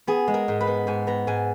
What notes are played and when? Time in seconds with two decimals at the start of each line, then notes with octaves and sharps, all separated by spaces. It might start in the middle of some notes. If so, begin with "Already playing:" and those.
0.07 B3 G#4
0.28 G#3
0.34 A#4
0.48 G#2
0.61 B4
0.67 B3
0.87 G#2 G#5
1.07 B3 A#5
1.27 G#2 G#5